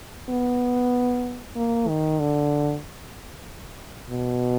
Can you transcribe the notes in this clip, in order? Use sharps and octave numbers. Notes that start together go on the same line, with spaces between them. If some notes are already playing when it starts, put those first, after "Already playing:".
B3
A#3
D#3
D3
B2